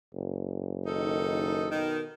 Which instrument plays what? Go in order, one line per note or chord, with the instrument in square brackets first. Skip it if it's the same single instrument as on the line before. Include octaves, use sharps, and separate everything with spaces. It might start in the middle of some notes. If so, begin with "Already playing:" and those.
[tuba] F#1
[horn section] D#3 D#4 A4
B2 D#3